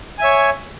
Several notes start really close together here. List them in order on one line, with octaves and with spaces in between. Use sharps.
G#5 E5 C#5